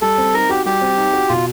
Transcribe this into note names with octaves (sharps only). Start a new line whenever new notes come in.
G3 A4
C4
D#4 A#4
F#4 G4
G3 G4
C4
D#4
F#4
B2 F4